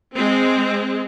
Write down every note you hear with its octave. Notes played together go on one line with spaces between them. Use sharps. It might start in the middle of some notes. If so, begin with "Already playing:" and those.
G#3 C4